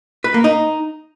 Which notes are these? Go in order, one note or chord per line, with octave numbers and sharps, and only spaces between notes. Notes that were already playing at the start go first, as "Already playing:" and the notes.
B4
A#3
D#4